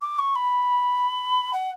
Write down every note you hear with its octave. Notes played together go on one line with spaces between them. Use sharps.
D6
C#6
B5
F#5